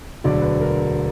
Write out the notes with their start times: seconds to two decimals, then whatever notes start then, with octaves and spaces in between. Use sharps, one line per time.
0.24 E1 D2 D3 F#3 D5
0.42 B4
0.61 A#4